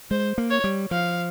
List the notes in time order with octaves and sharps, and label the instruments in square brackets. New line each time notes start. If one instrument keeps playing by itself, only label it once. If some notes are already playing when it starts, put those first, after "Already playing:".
[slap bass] G#3 [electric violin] C5
[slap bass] A#3
[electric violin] C#5
[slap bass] G3
[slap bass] F3 [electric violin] F5